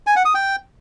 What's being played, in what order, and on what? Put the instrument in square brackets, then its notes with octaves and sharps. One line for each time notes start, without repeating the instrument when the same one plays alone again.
[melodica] G#5
F#5
D#6
G5